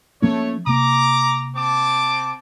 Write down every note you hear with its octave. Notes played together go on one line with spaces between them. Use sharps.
F3 A3 A#3 C#4 C#5
C3 A#3 A#5 D6
C4 A5 D6